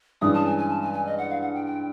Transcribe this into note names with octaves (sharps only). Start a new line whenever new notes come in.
G2 E3 G#3 C#4 D#6
A5
G#5
G#5
A5
G#5
G#5
D#5
F#5
F5
F#5
G5
G5